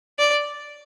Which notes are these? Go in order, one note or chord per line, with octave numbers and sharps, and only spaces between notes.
D5